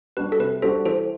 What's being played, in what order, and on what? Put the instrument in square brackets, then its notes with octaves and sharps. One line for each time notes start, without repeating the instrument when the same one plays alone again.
[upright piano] G3 D4 F#4 [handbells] B4
[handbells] A4
[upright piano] C3 [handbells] B4
[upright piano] G3 D4 F#4 [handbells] A4 C5
[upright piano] E3 [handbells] A4 C5